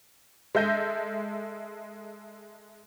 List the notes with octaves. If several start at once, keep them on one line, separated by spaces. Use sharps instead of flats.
G#3 A4 E5 G6 A#6 D#7